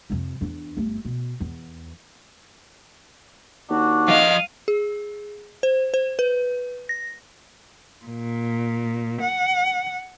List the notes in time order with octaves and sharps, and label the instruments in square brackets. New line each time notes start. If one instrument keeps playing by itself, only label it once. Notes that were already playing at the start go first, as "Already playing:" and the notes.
[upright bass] F2 C3
E2 D4
G1 A3
B2
E2
[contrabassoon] D#2 [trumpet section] D4 F#4
[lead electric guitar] F3 D#5 [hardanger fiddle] F5
[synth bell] G#4
C5
C5
B4
A#6
[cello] A#2
F#5